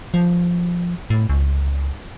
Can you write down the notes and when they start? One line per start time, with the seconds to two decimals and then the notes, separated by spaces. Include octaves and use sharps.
0.14 F3
1.10 A2
1.30 C#2